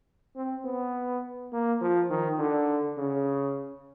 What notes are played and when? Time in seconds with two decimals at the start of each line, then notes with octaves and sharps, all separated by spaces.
0.36 C4
0.65 B3
1.53 A#3
1.81 F3
2.10 D#3
2.39 D3
2.97 C#3